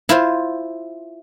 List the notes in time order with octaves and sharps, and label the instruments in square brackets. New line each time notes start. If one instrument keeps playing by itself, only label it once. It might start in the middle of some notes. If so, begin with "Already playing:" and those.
[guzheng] E4 F4 C5